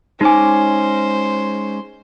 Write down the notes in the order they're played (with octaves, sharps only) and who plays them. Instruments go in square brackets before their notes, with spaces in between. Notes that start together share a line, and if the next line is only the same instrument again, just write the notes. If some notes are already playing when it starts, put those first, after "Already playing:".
[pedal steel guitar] G#3 C#4 D6 [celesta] D#4 G#5 [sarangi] C5